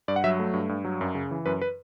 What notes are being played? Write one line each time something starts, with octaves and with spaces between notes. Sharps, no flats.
G2 D5
F#5
F#3 E5
A3
G2
G2
F#3
F#2
C#3
E3
F#2 B4
B4